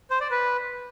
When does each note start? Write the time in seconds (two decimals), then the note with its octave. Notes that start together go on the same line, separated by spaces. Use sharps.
0.10 C5
0.21 D5
0.31 B4